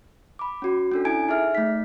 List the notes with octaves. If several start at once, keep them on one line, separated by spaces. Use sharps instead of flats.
B5 D6
C#4 F#4
C#4 D4 A4
E4 A4 G#5 G#6 D7
D#4 G#4 E5 F6
A3 D#4 B6